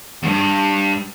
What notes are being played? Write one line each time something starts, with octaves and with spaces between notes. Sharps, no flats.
E2 G2